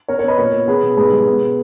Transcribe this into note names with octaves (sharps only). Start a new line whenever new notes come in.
B3 A#4 C#5
A#4 C#5
B3 B4 D#5
A#2 A#4 C#5
A#2
B3 G#4 B4
B2
G#2 G#4 B4
G3
B3
B2